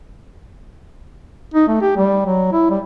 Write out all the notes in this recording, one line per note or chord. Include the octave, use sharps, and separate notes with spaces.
D#4
A3
G4
G3
F#3
E4
G3